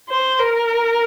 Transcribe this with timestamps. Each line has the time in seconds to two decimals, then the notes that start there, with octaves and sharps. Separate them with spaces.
0.09 C5
0.39 A#4